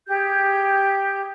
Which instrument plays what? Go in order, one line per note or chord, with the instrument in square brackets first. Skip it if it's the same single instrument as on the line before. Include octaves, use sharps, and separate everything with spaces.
[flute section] G4 G#4 G6